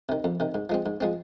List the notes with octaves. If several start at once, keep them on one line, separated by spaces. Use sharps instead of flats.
C3 D#3
F2
C3 D#3
G#2
F3 G#3 C4
G#2
F3 G#3 C4